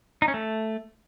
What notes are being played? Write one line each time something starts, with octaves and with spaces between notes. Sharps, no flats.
D#4
C#4
A3